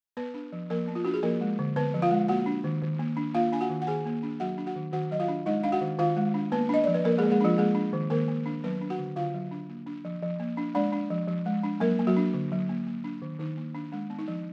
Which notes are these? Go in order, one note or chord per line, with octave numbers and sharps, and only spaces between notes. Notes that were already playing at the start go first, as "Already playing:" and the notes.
B3 B4
D4
F3
F3 A#3 A#4
B3
F4
D4 F#4
G#4
F3 A#3 A#4
G#3
D3
D3 B3 B4
F3
F4 F5
G#3
A#3 F#4 F#5
D4
D#3
D#3
A#3
D4
A#3 F4 F5
D4 G#5
F#4 F#5
D#3
F#5
D#3 G#4 G#5
A#3
D4
F#3 F#4 F#5
D4
F#4 F#5
D#3
D#3 F#4 F#5
F#3 D#5
F4 F5
D4
G#3 D#4 D#5
D4 F5
F#4 F#5
D#3
D#3 F4 F5
G#3
D4
A#3 B3 B4
D4 D#5
F3 D5
B4
F3 A#3 A#4
G#3 A#3 G#4
G#3 G#4
F3 D4 F4
G#3 A#3 G#4
D4
D#3
D#3 A#3 A#4
A#3
D4
F#3 B3 B4
D4
F#4 F#5
D3
D3 F4 F5
F#3
D4
A#3
D4
F3
F3
A#3
D4
G#3 D4 D5
D4
F3
F3
G#3
D4
F#3 A#3 A#4
A#3
F#3 F#4
D4
D3
F#3
A#3
A#3
D4
D#3
D#3 D#4
A#3
D4
G#3 D4
B3
D#4
F3